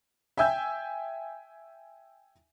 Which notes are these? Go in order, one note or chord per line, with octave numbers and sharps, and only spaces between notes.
E5 G5 G#5 E6 G6